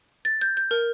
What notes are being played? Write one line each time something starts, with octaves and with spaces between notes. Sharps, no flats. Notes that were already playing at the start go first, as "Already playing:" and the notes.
A6
G6
G6
A#4